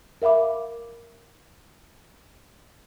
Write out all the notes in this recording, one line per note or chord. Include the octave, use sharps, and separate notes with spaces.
A#4 E5 F5 B5 D6